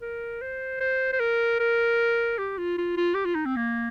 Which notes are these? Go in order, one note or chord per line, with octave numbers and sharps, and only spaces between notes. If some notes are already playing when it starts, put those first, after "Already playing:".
A#4
C5
C5
C5
A#4
A#4
G4
F4
F4
F4
G4
F4
D#4
C4
A#3